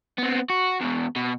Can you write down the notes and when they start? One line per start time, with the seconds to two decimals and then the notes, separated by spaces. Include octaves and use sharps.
0.18 B3 C4
0.50 F#4
0.81 E2 B2
1.16 B2